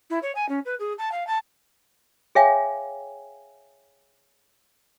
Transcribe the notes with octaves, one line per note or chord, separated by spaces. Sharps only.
E4
C#5
G#5
C#4
B4
G#4
A5
F5
A5
G#4 C#5 E5 F5 G5 G#5